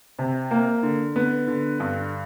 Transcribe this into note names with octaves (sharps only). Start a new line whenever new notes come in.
C3
A#3
D3
B3
D3
G2